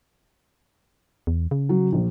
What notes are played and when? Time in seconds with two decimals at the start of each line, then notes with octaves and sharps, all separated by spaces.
1.27 E2
1.51 C#3
1.69 F#3
1.92 A#1